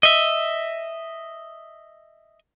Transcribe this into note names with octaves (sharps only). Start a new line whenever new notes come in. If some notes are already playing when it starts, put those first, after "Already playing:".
D#5 E5